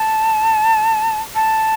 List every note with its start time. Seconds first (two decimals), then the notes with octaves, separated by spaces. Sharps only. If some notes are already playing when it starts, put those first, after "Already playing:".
Already playing: A5
1.35 A5